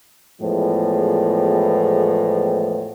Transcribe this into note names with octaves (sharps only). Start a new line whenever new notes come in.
E2 A2 F3 G#3 B3